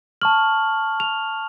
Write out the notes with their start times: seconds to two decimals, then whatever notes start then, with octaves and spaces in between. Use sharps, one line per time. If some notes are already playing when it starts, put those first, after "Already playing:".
0.22 A5 C#6 F6 F#7
1.00 F7